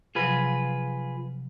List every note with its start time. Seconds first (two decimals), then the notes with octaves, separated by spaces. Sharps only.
0.15 C3 F3 F#3 F4 G#4 B4